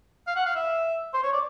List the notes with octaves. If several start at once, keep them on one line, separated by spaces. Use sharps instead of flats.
F5
F#5
F5
E5
C5
C#5
D5